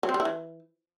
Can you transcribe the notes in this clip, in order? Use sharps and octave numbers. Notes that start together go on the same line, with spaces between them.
F#3
C4
G3
E4
E3